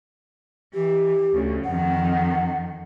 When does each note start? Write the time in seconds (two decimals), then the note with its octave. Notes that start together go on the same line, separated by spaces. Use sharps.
0.74 E3 G4
1.33 D2 C#3
1.64 F2 D#3 F#5